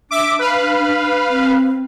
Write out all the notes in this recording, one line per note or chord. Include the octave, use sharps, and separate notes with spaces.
D4 E5 D6
B4 F5
C4